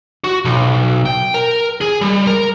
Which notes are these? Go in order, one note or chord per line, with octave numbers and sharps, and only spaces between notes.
F#4
B1
G5
A#4
G#4
G3
A#4